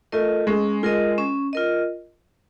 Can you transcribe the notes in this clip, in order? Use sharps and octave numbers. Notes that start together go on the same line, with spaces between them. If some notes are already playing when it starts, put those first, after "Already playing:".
A3 F4 A#4 D#5
G#3 C#4
G#3 F4 A#4 D#5
C#4
F4 A#4 D#5